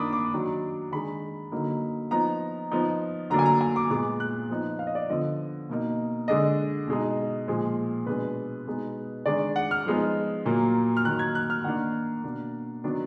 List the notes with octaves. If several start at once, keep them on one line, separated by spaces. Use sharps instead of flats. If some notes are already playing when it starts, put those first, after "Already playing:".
Already playing: D#3 A#3 D4 B5 D6 D#6
D6
D#3 F#3 D4
D#3 G#3 D4 B5
D3 F#3 A#3 D#4
F3 B3 D#4 A#5
F3 B3 D#4
D3 F#3 A#3 D4 A#5
G#5
A#5
G#5
D6
A#2 G#3 B3 D6
F#6
F3 B3 D#4
F5
D#5
D5
D3 F3 B3 D#5
B2 A#3 D#4
D3 G#3 D4 D#5
B2 G#3 D#4
A#2 F3 G#3
B2 G#3 D4 B4
B2 G#3 B3 D#4
D#3 G#3 D4 D5
F#5
F6
F3 G#3 B3 D#4
A#2 F#3 A#3
F6
D#3 F#3 A#3 F#6
G#6
F#6
F6
D#3 A#3 D4 F#5
B2 A#3 D4
D#3 F#3 B3 D4